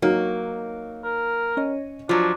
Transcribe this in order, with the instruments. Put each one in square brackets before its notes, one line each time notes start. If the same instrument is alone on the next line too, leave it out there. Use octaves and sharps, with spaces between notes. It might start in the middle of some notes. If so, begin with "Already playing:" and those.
[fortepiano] F#3 D#4 F#4 [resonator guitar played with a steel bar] A#3
[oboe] A#4
[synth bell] C#4 C#5 D#5
[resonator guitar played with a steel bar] F3 F#3 [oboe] D4 [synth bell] F4